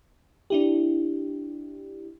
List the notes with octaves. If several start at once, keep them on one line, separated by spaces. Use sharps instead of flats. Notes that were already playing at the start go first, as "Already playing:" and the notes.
D4 E4 G4